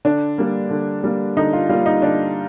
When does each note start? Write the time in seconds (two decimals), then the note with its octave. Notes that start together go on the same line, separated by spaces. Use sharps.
0.05 D3 D4
0.38 G3 A#3
0.70 D3
1.04 G3 A#3
1.37 D3 D#4
1.53 F4
1.69 G3 A#3 F4
1.86 D#4
2.02 D3 D4